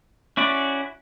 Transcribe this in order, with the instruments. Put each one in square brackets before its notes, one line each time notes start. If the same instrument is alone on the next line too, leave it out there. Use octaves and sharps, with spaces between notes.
[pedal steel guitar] C#4 E4 F#4 D5